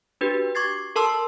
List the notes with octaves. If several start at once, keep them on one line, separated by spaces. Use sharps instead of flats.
D4 F#4 G4 B4
C#6 D6 G#6 A6 C7
A4 A#4 A5 C6 E6